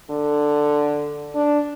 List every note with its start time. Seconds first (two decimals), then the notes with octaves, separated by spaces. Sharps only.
0.11 D3
1.35 D4